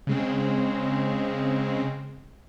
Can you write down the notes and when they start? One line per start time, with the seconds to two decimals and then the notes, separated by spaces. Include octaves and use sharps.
0.07 C#3 G#3 C4